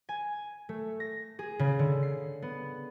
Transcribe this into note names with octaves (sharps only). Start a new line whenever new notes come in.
G#5
A3
A#6
G#4
C#3
D3
C7
B3